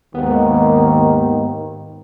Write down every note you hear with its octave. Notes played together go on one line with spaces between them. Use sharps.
D#2 G#2 D#3 B3